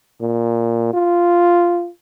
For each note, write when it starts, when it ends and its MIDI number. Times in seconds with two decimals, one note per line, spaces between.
0.21 0.93 46
0.93 1.88 65